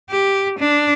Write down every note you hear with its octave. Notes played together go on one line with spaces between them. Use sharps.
G4
D4